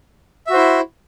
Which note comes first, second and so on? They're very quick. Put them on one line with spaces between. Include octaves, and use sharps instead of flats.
E5 F#4 C5 E4